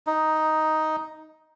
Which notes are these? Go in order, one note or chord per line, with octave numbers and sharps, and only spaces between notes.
D#4